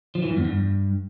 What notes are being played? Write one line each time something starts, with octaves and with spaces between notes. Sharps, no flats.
F3
E3
G2
E2
G2